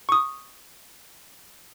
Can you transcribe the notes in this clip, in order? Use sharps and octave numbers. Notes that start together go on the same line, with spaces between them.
C#6 D#6